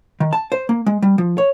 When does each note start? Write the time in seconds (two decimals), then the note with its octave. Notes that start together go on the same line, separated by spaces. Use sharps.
0.20 D#3
0.33 A5
0.52 C5
0.69 A#3
0.86 G#3
1.02 G3
1.18 F3
1.38 C#5